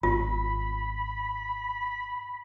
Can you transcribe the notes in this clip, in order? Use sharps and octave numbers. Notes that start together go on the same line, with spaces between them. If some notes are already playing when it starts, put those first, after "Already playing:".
G#1 B3 F4 B5